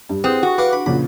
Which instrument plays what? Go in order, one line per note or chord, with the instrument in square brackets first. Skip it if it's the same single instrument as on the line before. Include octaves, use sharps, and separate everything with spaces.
[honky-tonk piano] G2 [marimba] G4
[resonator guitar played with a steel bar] C4 [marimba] E4 G#4 B4 [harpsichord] F#5 [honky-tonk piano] D#6
[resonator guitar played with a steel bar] F#4 [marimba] G5 C#6
[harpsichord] B4 F5 F#5 [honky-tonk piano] D6
[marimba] D4 [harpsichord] B5
[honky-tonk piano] A#2 C#3 F3 [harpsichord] B5